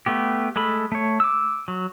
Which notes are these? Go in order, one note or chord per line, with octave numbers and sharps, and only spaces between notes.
A3 B3 G4
G#3 A3 A4 B5
A3 C#5
D6 E6
F#3